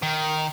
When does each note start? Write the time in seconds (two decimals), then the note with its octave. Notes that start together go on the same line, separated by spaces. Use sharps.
0.02 D#3